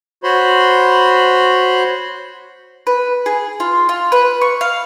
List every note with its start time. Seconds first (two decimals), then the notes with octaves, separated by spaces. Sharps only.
0.24 F#4 C5 C#5 B5 C6
2.87 B4
3.26 G#4
3.60 F4
3.89 F4
4.12 B4
4.41 C#6
4.61 F5